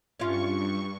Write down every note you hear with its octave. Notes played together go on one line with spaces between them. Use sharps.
G2 C#4 F4 C#6